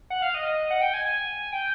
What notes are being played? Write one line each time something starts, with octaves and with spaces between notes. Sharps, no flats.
F#5
F5
D#5
D#5
F#5
G5
G#5
G#5
G5